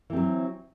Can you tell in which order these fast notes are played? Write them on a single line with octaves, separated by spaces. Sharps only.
E3 C4 F#3